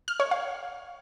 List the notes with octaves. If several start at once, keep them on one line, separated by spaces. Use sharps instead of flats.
F6
C#5
F5